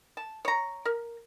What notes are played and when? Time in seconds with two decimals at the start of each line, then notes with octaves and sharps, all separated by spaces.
0.17 A5
0.45 C#5 A#5
0.85 A#4